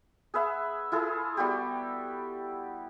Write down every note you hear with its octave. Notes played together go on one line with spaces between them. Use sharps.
G#4 B4 E5 F#5
E4 F4 G#4 A4
G3 B3 F#4 G4